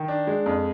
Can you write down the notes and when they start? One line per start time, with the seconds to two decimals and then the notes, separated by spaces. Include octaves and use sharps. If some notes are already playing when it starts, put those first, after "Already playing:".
Already playing: D#3
0.08 D4
0.27 G#3
0.46 F2